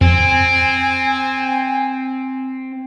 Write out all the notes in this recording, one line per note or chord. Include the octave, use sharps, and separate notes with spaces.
F2 C4 G#5